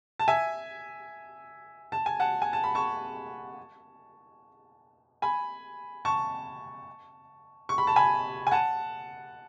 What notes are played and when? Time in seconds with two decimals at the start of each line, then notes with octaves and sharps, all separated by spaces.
0.20 A5
0.28 E5 G#5
1.92 A5
2.06 G#5
2.20 F#5 A5
2.42 G#5
2.53 A5
2.64 B5
2.75 A5 C#6
5.22 G#5 B5
6.05 A5 C#6
7.69 C#6
7.78 B5
7.87 A5
7.96 G#5 B5
8.47 G#5
8.51 F#5 A5